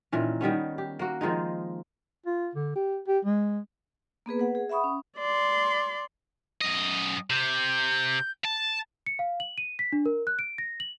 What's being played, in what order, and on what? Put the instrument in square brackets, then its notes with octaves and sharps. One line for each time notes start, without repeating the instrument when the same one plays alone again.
[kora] A#2 D#3 E3 C#4
D#3 G3 B3 C#4
G4
A#3 F#4
D#3 F3 G#3 D#4
[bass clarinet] F4
D3
G4
G4
G#3
[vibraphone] A#3 B3 G#4 B4
B4 F#5
G#4
E5 F#5 B5 C#6 D#6
C#4
[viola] D5 C6
[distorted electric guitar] F#2 D#5
[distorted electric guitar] C3 [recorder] G6
[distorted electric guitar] A5
[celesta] C#7
F5
F#7
D#7
B6
D4
A#4
F#6
D7
A#6
F#7